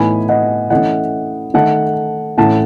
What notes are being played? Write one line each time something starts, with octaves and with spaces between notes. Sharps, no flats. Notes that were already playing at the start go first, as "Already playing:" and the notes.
Already playing: A2 E3 B3 D#4 G#5 B5
D#5 F#5
E3 A3 C#4 D#5 F#5
D#3 A3 D#4 F#5 A5
A2 E3 A3 C#4 F#5 A5